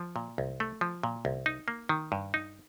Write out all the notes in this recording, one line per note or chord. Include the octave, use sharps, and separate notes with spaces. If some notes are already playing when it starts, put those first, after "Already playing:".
Already playing: F3
A#2
C2
A3
F3
A#2
C2
D#4
A#3
D#3
G2
D#4